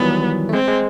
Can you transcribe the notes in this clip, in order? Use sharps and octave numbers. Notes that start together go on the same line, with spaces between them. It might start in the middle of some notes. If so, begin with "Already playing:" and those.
Already playing: D#3 E3 F#3 G3 B3
A3
G#3 C4
G#3